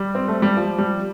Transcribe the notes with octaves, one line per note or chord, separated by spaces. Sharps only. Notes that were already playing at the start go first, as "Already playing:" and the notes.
Already playing: G3
C4
A3
G3
F3
G3